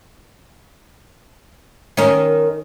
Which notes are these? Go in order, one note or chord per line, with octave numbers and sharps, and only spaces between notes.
D#3 C#4 A#4